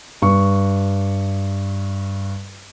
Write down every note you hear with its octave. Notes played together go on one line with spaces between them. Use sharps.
G2 C#6